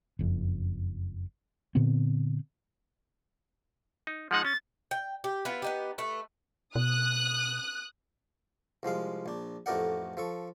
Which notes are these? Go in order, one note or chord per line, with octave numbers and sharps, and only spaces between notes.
F#1 F2
A#2 D3 B3 C4
D#4
F3 G#3 D#4 F#5
C#4 A6
G5
G4
B3 E4 F4
B3 D#4 G4
A3 B4
B2 D#6 F#6
C2 F3 G#3 F5
A#1 D4
A1 F2 A3 A#4 D5 F#5
F3 A4 C#6